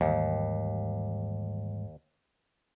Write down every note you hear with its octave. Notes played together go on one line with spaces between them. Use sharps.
D#2 G#2 E3 G3